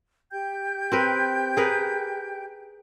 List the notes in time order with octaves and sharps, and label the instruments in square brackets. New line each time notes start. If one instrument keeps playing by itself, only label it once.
[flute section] G4 G5 G6
[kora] C4 A#4 B4
G#4 A#4 B4